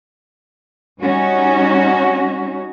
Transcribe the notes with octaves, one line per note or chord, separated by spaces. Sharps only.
G3 C#4 D#4 F#4